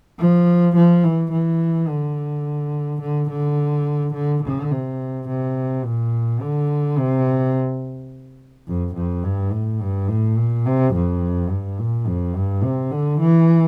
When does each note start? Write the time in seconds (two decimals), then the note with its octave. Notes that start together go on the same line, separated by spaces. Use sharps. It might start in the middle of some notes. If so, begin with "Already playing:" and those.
0.19 F3
0.76 F3
1.04 E3
1.32 E3
1.88 D3
3.01 D3
3.30 D3
4.14 D3
4.43 D3
4.71 C3
5.28 C3
5.84 A#2
6.41 D3
6.98 C3
8.68 F2
8.95 F2
9.24 G2
9.52 A2
9.81 G2
10.08 A2
10.37 A#2
10.66 C3
10.94 F2
11.50 G2
11.79 A#2
12.07 F2
12.35 G2
12.63 C3
12.92 D3
13.20 E3